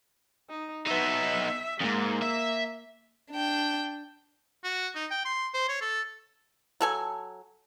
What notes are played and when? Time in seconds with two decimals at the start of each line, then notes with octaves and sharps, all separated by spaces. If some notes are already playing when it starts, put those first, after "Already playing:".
0.49 D#4
0.86 B3 D#4 E5
1.80 F2 G#2 A#3
2.22 E5
3.31 D4 G5
4.64 F#4
4.95 D#4
5.11 G5
5.25 C6
5.54 C5
5.69 C#5
5.81 A4
6.81 F#3 A4 G#5